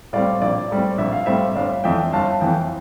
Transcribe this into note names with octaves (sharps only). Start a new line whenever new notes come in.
A2 G3 C4 D5 F5
A#1 D5
A2 G3 C4
A#1 E5
F5
A2 G3 C4 E5
G1 D5 F5
F2 E3 E5 G5
G1 F5 A5
F2 E3 E5 G5